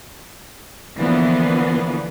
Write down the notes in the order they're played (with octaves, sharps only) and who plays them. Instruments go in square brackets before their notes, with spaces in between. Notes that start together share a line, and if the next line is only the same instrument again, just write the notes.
[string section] D3 E3 F3 A#3 B3